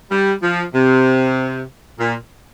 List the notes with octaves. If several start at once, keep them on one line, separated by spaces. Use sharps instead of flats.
G3
F3
C3
A#2